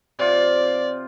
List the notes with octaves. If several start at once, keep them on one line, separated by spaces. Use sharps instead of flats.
C3 F4 D5